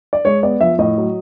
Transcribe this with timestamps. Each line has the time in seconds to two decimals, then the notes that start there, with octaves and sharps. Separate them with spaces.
0.13 D5
0.25 G#3 C#5
0.43 B3 D5
0.61 F3 E5
0.79 A2 D#5
0.98 F#3